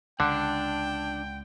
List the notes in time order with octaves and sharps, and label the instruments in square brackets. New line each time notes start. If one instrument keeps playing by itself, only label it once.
[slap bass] C#2 [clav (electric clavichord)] D3 [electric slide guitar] D4 [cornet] G5